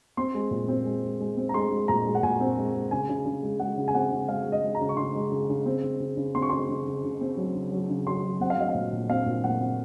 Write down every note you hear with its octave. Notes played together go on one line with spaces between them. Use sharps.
C4 C6
G#3
A#2
C4
G#3
G#3
G#3
C4
A#5
G#3 C6
G#3
A#2 A#5
G#3
F#5
A#2 G#5
C4
G#3
G#3
C#3 G#5
C#3
C#3
G#3
G#3 F#5
C#3
G#5
C4 F#5
C#3
G#3 F5
G#3
D#5
G#3
A#5
C#3
C#6
C#3 C6
G#3
C#3
C#3
C4
C#3
C#3
C#3
C4 C6
C#6
C#3 C6
C#3
C#3
C#3
C4
F#3
C#3
F#3
C#3
F#3 C6
F#3
C4 F#5
F5
F#3 D#5
F5
A#2
A#2
C4 F5
A#2
A#2 F#5
C4